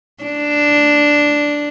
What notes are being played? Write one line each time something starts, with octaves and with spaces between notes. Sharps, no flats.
D4